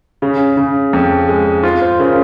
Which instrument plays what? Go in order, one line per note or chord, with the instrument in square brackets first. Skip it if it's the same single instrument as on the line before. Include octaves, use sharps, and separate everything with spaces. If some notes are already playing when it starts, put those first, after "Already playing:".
[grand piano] C#3 [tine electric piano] G#4
[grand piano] C#3
F2
G#3
[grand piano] F4 [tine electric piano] C5
[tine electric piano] C5
[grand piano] C#3 [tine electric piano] A#4